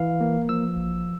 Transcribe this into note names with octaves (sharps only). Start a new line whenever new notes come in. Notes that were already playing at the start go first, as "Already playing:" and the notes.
Already playing: E3 F5
A#3
F3 E6
A1